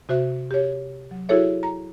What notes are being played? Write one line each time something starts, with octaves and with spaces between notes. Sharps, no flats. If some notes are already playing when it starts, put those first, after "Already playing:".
C3 F#4 C5 E5 F#6
G4 C#5
F#3
E4 F#4 G#4 A4 C#5 E5
A#5